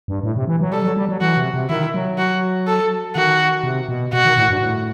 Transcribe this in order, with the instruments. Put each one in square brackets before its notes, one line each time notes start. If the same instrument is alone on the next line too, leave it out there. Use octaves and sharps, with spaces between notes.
[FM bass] G2
A2
C3
E3
F#3
[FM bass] G3 [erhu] A4
[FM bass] F#3
G3
F#3
[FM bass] E3 [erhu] F#4
[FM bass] C3
C3
[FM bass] D#3 [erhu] E4
[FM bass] F#3
[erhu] F#4
A4
[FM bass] D#3 [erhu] F#4
[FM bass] C3
B2
[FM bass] B2 [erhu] F#4
[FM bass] D#3
A2
G2
A2